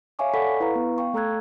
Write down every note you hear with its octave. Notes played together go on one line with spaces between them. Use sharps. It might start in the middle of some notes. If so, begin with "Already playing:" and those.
C#5 E5 F5 G#5 C#6 D6
A4 D5 F#5 B5 C#6 B6
E4 B4 F5 A#5
B3 C#6
F5 G5 C#6
A3 A4 A#5 E6 F#6 G#6